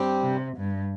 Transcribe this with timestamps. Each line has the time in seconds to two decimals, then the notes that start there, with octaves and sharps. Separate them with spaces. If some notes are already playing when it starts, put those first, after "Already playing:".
Already playing: G2 G3 C4 G4
0.22 C3
0.56 G2